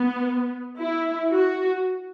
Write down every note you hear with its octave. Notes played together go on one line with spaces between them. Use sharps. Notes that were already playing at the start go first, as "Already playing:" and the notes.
Already playing: B3
E4
F#4